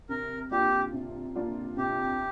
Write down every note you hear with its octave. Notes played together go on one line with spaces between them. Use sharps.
C3 A#4
A#3 D4 F4 G4
C3
A#3 D4 F4
C3 G4